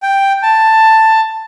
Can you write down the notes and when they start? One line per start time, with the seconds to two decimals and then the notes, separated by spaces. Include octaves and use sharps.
0.02 G5
0.43 A5